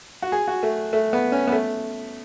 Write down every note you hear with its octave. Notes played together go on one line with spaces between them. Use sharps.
F#4
G#4
F#4
A3
A3
B3
C#4
B3
A3